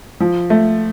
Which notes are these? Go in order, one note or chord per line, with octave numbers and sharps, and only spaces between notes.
F3
A3